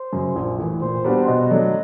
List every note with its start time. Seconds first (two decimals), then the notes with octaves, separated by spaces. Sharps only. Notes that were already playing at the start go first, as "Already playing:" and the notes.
Already playing: C5
0.13 F#2 C#3
0.36 A#1
0.58 A2 E3
0.82 A#2 C5
1.04 G3 B3 D4 F#4
1.27 B2 D#5
1.50 F#3 A3 D4